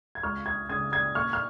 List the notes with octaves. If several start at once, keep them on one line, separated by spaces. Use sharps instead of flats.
G#6
C#2 C#6 F6
D#6 G#6
C#3 G#3 C#4 D#6 G#6
D#6 G#6
A#2 C#6 F6
F6